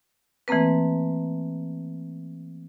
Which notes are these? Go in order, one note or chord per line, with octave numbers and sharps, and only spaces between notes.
E3 A3 A#3 C4 B4